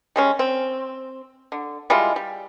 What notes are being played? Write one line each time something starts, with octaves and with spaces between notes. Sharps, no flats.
G3 G#3 C#4
C4
D3
G3 G#3 E4 F4
G3